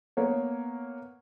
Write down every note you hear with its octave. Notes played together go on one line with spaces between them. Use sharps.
A#3 B3 C#5